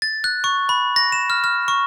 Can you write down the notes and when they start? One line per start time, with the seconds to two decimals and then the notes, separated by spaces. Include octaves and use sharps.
0.02 A6
0.24 F#6
0.44 C#6
0.69 B5
0.96 A#6
1.12 E7
1.30 F6
1.44 F6
1.68 C#6